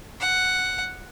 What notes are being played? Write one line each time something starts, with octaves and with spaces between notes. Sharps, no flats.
F#5